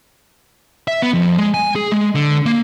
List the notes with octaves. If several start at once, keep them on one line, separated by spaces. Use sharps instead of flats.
E5
B3
F2
G#3
G#5
G#4
G#3
D3
A#3